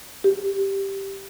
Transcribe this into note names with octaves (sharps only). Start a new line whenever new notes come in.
G4